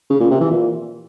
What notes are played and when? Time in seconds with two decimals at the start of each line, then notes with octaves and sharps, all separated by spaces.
0.10 C#3
0.20 A#2
0.31 C3
0.41 E3
0.51 A#2